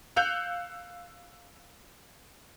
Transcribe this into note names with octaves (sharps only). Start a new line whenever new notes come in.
F5 E6 F#6 G6 C#7 F7